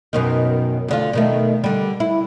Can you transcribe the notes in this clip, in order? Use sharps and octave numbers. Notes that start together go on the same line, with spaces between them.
F#2 B2 D#3
D2 D3 F4
B2 D#3 A3
D3 G3
E4